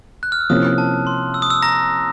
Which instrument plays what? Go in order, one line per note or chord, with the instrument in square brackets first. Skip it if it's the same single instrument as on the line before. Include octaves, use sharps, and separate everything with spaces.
[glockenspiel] F#6
F6
E6
[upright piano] C3 F3 A#3 C#4 E4 [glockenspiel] D#6
[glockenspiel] A5
C6
E6
D#6
E6
A#5 A#6